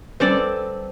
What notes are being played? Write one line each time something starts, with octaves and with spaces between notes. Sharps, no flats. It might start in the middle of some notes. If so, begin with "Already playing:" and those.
G3 C4 C#4 A4 B4 D5